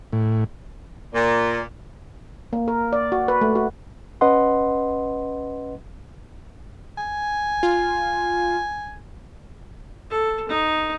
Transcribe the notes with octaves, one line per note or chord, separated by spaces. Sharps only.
A2
A#2
A#3
A#4
D5
F#4
B4
A3
F#4
C#4 B4 D#5 F#5 C6
G#5
F4
A4
D#4